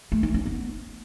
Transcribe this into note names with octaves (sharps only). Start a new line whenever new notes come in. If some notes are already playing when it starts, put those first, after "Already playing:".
A3
D#4
C#4
B3